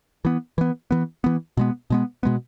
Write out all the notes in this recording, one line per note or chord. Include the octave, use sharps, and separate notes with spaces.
E3 B3
E3 B3
E3 B3
E3 B3
B2 G#3 B3
B2 G#3 B3
B2 G#3 B3